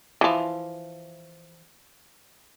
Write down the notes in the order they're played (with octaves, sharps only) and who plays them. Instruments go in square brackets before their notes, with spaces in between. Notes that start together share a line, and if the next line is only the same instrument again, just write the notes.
[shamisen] E3 F3